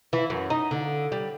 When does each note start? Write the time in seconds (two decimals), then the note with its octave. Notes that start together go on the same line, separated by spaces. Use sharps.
0.13 E3
0.30 F#2
0.50 D#4
0.71 D3
1.12 G3